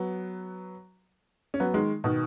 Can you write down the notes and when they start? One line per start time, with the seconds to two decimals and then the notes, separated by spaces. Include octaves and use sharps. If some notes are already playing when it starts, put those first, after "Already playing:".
Already playing: F#3 B3
1.54 C#4
1.60 F#3 B3
1.74 D#3 G#3
2.04 B2 D#3